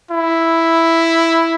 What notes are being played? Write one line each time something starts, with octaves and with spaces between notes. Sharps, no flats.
E4